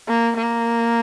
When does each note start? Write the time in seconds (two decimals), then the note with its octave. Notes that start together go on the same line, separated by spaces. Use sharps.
0.08 A#3
0.37 A#3